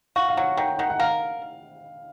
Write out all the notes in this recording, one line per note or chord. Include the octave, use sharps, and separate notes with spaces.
F#4 F5
F5
F#3 F#5
D#3 G5
D#3 F#5
F#5
A#4 F5